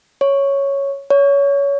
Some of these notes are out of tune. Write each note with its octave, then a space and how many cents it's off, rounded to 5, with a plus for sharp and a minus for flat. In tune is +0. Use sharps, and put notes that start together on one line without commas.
C#5 +0
C#5 +20